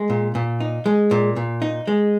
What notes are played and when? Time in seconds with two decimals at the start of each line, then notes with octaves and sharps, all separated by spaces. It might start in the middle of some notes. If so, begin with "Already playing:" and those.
Already playing: G#3
0.10 A#2
0.35 A#2
0.60 D#4
0.86 G#3
1.11 A#2
1.36 A#2
1.62 D#4
1.87 G#3